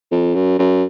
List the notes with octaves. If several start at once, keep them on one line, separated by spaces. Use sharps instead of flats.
F2
F#2
F#2